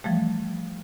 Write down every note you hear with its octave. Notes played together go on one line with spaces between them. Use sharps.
E3 F3 G3 A3